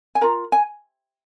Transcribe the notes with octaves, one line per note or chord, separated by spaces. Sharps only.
G#5
F4 A#4 A#5
G#5